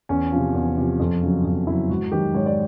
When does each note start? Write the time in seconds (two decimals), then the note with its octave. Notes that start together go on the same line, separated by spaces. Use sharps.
0.09 E2 C#4
0.32 C3 F3
0.54 E2
0.77 C3 F3
0.99 F2
1.22 C#3 F#3
1.45 F2
1.67 C#3 F#3 E4
1.89 G#2 F#4
2.12 D#3 F#3 G4
2.34 G#2 C#5
2.46 D5